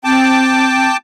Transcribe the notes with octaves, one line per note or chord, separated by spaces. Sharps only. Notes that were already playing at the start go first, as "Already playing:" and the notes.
C4 G5 A5 D6